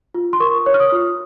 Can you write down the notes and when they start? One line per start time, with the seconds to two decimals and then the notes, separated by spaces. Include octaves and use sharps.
0.14 F4
0.33 C6
0.40 A#4 C#6
0.66 C#5
0.74 F6
0.80 D#6
0.92 F4